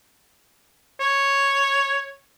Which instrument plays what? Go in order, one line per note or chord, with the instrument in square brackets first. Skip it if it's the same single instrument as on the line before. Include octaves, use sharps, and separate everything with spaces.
[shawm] C#5